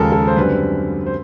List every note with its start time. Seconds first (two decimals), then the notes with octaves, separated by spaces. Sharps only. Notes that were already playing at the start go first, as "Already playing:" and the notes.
Already playing: D#2 C#3 F3 G#3 A4 A#4
0.12 A4
0.27 C5
0.37 F#2 D3 G3 C4 B4
1.06 C5